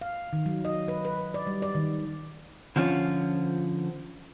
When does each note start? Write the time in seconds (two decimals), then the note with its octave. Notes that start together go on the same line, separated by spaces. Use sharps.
0.01 F5
0.33 D#3
0.46 F#3
0.65 D#5
0.88 B4
1.05 B4
1.34 D5
1.47 G3
1.62 D5
1.75 D#3
2.76 D3 F3 C#4 F4